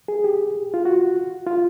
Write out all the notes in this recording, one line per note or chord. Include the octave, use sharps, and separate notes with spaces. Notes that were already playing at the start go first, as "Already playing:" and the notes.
G#4
G4
F4
F#4
F4